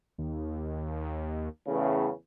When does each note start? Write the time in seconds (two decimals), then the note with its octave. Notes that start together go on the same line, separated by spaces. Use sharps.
0.18 D#2
1.67 E2 A2 C#3